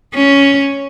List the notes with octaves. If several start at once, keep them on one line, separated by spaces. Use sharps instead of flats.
C#4